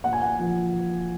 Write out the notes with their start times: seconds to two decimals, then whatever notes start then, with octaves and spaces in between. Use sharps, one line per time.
0.04 A#2 F#5
0.13 G#5
0.22 F#5
0.39 F3